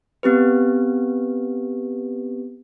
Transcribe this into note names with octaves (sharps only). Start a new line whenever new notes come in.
B3 C4 G4 B4